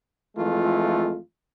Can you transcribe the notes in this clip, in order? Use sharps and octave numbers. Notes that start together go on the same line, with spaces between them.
F2 E3 G#3 A3 F4